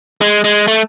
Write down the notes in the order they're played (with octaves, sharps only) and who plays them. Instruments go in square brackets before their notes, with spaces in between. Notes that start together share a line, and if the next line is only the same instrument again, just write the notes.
[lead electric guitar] G#3
G#3
A3